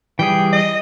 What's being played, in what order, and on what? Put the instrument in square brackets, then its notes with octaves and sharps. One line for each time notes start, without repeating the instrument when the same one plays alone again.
[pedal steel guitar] E3 G3 G#4 [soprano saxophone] G5
[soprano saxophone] D#5